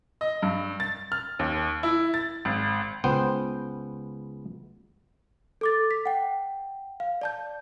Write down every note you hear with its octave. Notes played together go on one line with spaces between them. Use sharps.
D#5
G2
A6
F6
D#2
E4
A6
G#1
C#2 B3 C5 G5
A4 D6 A6
B6
F#5 G5
F5
D5 A5 G6